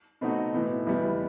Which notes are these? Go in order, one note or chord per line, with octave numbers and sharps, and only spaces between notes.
B2 A3 C4 D#4 F#4
A2 E3 B3
E2 B2 G3 B3